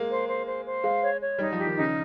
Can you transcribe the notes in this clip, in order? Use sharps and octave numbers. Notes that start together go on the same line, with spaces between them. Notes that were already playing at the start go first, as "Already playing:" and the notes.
Already playing: G#3 A#3
C5
C5
C5
C5
G#3 F5
C#5
C#5
G3 D#4
F3
G4
D#3
C#3 D#4